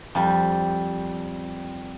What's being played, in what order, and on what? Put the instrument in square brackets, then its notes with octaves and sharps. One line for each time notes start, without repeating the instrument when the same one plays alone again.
[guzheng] F2 G3